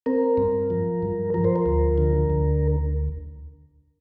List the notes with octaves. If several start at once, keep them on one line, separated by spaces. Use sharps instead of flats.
C4 A#4
G2
F3
G2
F3 A#4
C5
A#4
D2
D3
D2